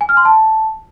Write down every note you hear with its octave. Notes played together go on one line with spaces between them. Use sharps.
G#5
F6
C6
A5